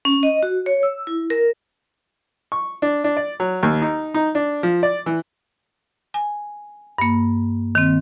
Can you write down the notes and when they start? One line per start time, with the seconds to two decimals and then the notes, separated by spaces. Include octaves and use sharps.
0.05 C#4
0.23 D#5
0.43 F#4
0.66 C#5
0.83 E6
1.07 E4
1.30 A#4
2.52 C#6
2.82 D4
3.04 D4
3.17 D5
3.40 F#3
3.63 D#2
3.82 D#4
4.14 D#4
4.35 D4
4.63 F3
4.83 D5
5.06 E3
6.14 G#5
6.98 G2 A#3
7.75 D#3 C4